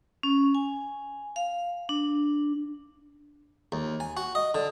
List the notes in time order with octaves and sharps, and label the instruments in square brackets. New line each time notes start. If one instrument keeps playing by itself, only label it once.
[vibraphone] C#4
G#5
F5
D4
[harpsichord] D#2
G#5
F#4
D#5
D3